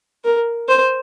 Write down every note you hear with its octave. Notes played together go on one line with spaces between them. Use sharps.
A#4
C5